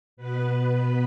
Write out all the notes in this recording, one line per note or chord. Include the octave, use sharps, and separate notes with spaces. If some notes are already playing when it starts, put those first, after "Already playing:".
B2 B3 B4